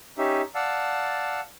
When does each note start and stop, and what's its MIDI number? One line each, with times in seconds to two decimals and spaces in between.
0.18 0.42 61
0.18 0.42 63
0.18 0.42 67
0.18 0.42 76
0.55 1.40 74
0.55 1.40 77
0.55 1.40 78
0.55 1.40 81
0.55 1.40 88